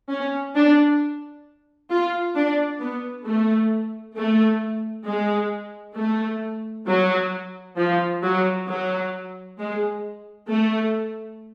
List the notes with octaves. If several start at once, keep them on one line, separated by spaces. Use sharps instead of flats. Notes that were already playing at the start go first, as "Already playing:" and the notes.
C#4
D4
F4
D4
B3
A3
A3
G#3
A3
F#3
F3
F#3
F#3
G#3
A3